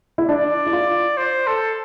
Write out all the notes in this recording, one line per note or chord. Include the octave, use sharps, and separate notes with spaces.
E4
D4 D5
E4
F4
C5
A4